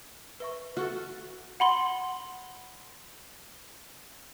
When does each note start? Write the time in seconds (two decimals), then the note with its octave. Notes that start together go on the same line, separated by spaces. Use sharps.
0.40 B4 E5 C#6
0.77 F#4 A4 C#6 F6
1.60 F#5 B5 C6